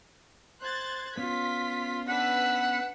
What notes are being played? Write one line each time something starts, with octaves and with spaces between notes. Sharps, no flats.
C5 F#6 G#6 A6
B3 C#4 F4 B6
D4 B4 F#5 E6 B6